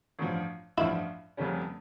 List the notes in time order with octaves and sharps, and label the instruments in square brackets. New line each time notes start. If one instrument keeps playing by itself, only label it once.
[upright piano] A1 G2 F3
[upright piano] A1 G2 F3 [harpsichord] E4
[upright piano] F1 F2 C#3 G3 C#4